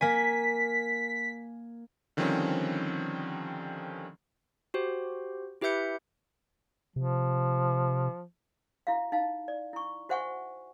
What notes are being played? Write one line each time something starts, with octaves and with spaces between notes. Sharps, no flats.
A#3 G#5 B6
D3 D#3 F3 G3 C4 C#4
F#4 G4 C5
E4 G4 B4 E5 G6 C#7
C3 F3
E4 F#4 E5 F5
D#4 F5 A5
D5
E4 C#6
F#4 C5 E5 F#5 G#5 C#6